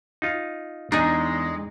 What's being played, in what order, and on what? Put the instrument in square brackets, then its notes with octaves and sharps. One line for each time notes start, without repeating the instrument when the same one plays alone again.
[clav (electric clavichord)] D#4 F4
[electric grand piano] E2 [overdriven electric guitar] G#3 [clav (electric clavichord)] D4 [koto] D#4 G#4